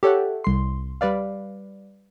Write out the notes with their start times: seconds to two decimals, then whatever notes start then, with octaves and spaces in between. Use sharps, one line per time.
0.03 G4 A4 C#5 E5 F#5
0.44 C2 C6
1.01 G3 B4 D5 F5